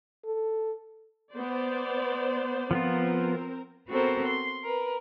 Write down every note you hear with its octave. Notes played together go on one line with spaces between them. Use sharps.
A4
B3 C5 D5
F3 B3 C4 F4 A#4
B3 C4 F#4 A4 A#4 C5
C6
A#4 B4